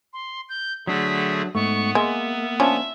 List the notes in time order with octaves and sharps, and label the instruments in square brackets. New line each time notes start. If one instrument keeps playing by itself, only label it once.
[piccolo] C6
G6
[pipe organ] D3 A3 G#4 [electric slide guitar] F#3 D4 [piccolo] B6
[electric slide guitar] G#2 A3 [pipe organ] B3 [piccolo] C#6
[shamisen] G#3 [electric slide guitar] A#3 [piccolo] E5
[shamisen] F3 C#4 D4 [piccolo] E5